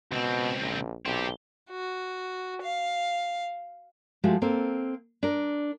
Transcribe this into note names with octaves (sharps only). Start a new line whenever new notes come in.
C#2 B2 C4
A#1
B1 C4 G4
F#4
F5
F3 G#3 A3 F#4 G4
A#3 C4 A4 C5
D4 A#4